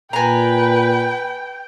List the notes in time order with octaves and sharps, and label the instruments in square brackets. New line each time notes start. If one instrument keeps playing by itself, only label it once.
[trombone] A#2 [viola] B4 [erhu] G5 [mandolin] G#5 A#5